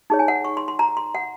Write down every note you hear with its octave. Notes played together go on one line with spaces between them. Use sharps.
D#4 G#4 C#5
G#5
F#5
C#6
C6
C6
A#5
C6
F#5